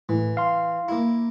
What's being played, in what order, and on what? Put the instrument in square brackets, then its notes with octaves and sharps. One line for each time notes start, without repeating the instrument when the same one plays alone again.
[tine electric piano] A2 [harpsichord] E3
[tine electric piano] F5 C6
[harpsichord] A#3 E4